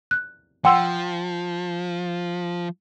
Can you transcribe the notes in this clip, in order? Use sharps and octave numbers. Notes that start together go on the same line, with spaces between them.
F#6
F3 F#5 G5 C6 E6